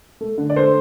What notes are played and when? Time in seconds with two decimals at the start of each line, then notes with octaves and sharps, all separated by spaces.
0.21 A3
0.38 D3
0.50 D5
0.56 A3 C5